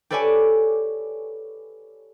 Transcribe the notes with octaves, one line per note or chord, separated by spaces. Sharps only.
G4 A4 B4 C#5 D5 G#5